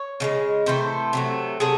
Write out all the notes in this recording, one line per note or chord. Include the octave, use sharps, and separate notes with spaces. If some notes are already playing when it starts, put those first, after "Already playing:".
Already playing: C#5
C#3 E3 G#3
C3 E3 A3 C5
C3 F#3 A3
C3 F#3 A3 G#4